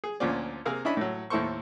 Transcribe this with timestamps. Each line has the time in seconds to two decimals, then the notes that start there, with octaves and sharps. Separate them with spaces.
0.04 G#4
0.20 D2 A#2 F3 C#4 F4 D5
0.65 C3 A#3 G#4 A#4 F5 E6
0.85 C#4 D4 E4 D#5 B5
0.97 A2 F#3
1.30 D#2 A2 E4 A4 C5 C#6